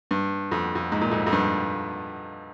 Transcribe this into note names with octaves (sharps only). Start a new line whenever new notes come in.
G2
F2
F2
G#2
A#2
F2 G#2
F2
G2